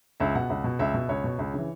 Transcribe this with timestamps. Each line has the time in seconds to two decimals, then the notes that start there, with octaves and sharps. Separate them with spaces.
0.20 C#2 E5
0.35 B2 F#5
0.50 C#2
0.64 B2
0.79 C#2 E5
0.94 B2
1.09 C#2 C#5
1.24 B2
1.39 C#2
1.54 C#3 E3